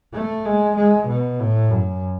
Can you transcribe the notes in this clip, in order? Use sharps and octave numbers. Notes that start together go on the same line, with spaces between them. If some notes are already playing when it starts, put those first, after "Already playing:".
A3
G#3
G#3
B2
A2
F#2